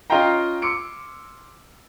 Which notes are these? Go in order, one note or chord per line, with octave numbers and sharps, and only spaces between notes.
C#4 F4 D#5 F5 G5 A#5
C6 D6 E6 C#7 D7